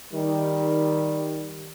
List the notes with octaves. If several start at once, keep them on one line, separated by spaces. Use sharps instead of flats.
D#3 G3